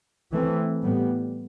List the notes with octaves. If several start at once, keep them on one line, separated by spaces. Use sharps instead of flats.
E3 A3 C4
A2 G3 B3